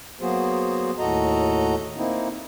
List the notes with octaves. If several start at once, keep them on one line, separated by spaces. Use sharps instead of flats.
F#3 A#3 B3 F#4 G#4 C5
D#2 A2 F#4 A4 D#5 A#5
A#3 C4 D#4 E4